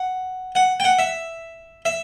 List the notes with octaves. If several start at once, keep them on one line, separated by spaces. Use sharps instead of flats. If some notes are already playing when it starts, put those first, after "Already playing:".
Already playing: F#5
F#5
G5
F#5
E5
E5